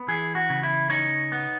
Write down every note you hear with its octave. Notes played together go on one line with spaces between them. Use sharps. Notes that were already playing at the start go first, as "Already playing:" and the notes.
Already playing: B3
E3 G#4
F#4
C#3
E4
D#4 C#5
B3